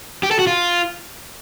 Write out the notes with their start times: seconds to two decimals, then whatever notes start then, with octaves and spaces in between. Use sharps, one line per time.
0.23 G4
0.31 A4
0.39 F#4
0.47 F4